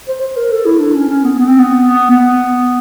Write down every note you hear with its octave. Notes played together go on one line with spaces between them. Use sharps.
C5
C5
A#4
A4
E4
D4
C#4
C#4
B3
B3
C4
B3
B3